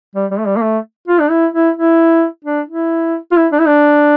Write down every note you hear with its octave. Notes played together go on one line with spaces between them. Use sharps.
G3
G3
A3
G3
A#3
A3
F4
D4
E4
E4
E4
D4
E4
F4
E4
D4
E4
D4